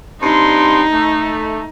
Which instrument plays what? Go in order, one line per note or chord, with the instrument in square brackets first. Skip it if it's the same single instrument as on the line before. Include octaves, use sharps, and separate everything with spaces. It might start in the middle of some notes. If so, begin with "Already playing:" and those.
[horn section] G2 C4 C6 [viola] D#4
[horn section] A3